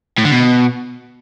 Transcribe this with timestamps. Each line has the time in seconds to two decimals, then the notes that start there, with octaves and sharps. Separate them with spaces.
0.18 A2
0.25 D3
0.32 B2